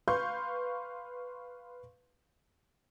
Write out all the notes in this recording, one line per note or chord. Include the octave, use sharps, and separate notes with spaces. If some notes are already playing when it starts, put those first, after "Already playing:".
B4 F5 C6 C#6 G6